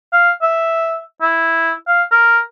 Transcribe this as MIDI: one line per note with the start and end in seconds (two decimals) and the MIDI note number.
0.13 0.31 77
0.42 1.01 76
1.22 1.72 64
1.88 2.03 77
2.11 2.39 70